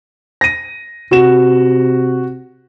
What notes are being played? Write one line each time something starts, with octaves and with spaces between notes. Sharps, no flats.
A#6 D#7
C3 F#4 E7